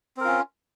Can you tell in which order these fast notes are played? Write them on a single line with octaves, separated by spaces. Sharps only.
C4 A#4 F4 C#4